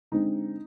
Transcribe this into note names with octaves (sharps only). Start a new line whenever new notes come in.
D3 G#3 C4 D#4